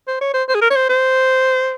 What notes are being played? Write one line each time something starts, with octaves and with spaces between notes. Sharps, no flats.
C5
C#5
C5
C5
G#4
A#4
C#5
C5
C5